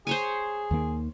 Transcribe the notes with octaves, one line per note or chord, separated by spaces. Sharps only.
G#4 C5 C#5 G#5
D#2 D#3 A#3